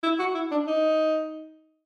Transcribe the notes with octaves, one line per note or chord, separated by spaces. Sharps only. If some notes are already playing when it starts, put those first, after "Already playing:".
E4
F#4
E4
D4
D#4